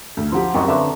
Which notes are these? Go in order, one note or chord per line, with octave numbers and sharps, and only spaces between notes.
D2
F3 G4 F#5 A#5 C6
F#1 F#2 C4 G4 D#5 A#5 C#6
D3 B4 C#5 E5 A5